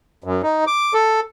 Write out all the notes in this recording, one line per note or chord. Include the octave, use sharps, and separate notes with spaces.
F#2
D#4
D6
A4